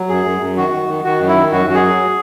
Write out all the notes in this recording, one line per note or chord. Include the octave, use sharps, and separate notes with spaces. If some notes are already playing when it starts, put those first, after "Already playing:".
Already playing: F#3
F#2 G#4
F#2
F#2
D#3 F#4
D#3
D#3
D#3 F#4
F#2
E4
D#3
F#2 F#4
F#2 F#4
G#4
F#3